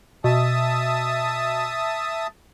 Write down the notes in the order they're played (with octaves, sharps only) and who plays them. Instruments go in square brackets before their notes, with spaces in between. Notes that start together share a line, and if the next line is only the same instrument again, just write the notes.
[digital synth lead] B2 [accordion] E5 A5 D#6